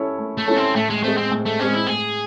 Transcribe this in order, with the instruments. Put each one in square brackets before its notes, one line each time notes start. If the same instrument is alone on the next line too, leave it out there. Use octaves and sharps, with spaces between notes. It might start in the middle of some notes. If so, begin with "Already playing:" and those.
Already playing: [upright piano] C#4 E4 A4 C#5
A3
[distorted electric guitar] A3
[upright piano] C#4 E4 A4 C#5
[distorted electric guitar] C4
[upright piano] A2 [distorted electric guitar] A3
[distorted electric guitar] G#3
[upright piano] G#3 C4 [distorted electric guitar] A3
[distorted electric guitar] C4
[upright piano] A2
[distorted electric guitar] A3
[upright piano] G#3 C4 [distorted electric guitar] C#4
[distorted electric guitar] E4
[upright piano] A2 [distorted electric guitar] G#4